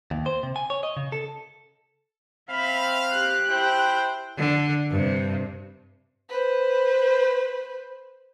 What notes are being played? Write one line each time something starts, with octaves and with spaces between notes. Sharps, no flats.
D#2
C5
C3
G#5
C#5
D#5
C#3
A4
C4 E5 F5 B5
G4 F#6
E4 C5 G5
D3
G2 C3
B4 C5